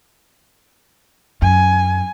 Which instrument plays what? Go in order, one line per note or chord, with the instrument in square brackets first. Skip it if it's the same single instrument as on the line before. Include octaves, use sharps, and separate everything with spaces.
[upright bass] F#2 [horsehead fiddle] G#5